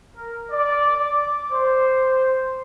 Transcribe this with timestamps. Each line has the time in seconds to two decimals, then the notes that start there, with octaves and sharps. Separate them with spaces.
0.16 A#4
0.51 D5
0.97 D6
1.51 C5